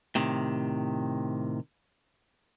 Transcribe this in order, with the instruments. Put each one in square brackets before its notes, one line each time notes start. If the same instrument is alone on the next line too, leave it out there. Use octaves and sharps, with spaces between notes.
[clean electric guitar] A2 C3 D#3